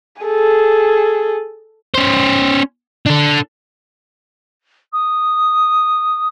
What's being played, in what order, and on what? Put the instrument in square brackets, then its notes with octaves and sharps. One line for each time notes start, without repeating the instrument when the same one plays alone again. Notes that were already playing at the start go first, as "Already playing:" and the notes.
[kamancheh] G#4 A4
[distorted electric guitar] C#4 C5
D4 A4
[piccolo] D#6